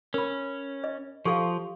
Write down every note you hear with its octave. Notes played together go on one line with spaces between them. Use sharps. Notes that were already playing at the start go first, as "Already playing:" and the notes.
C#4 A#4 B5
D#5
F3 G4 A4 F5